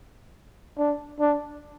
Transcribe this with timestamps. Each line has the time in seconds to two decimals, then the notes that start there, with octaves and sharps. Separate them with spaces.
0.78 D4
1.20 D4